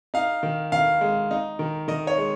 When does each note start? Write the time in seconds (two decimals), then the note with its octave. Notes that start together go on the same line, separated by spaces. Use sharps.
0.14 D#4 F5
0.43 D#3
0.72 D#3 F5
1.01 G#3
1.31 D#4
1.59 D#3
1.88 D#3 D#5
2.07 C#5
2.18 G#3